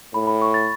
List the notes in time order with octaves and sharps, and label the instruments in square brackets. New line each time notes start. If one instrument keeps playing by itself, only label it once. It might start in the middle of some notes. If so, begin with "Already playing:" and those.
[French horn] A2 [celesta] B5
[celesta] B5
C#6
A6